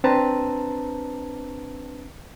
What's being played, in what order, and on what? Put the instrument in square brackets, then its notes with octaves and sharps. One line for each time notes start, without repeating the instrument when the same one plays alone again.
[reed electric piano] C4 D4 B4 C5 A5 A#5